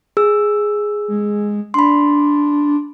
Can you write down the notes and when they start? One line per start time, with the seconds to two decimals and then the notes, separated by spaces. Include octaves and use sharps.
0.17 G#4 E6
1.08 G#3
1.74 D4 B5 C6